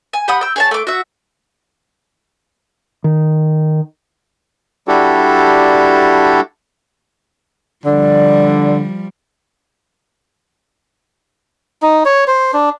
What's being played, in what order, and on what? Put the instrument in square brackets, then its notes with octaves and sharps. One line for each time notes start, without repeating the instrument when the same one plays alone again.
[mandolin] G#5
G4 F#5 B5 D#6
G5 E6
G#4 C#5 A5
A3 D6
F#4 E5
[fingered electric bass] D#3
[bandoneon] G3 D4 E4 F#4 G4 A4
[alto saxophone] D3 [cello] F3 G3 [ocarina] D5
[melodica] D#4
C#5
C5
D4